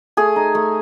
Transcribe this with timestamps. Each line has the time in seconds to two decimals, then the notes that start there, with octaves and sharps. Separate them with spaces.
0.17 A3 G#4
0.36 D#4
0.55 A3